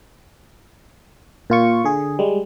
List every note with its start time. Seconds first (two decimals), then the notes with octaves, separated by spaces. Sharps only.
1.50 A#2 F4 C#6
1.85 D3 G#4
2.19 G3 G#3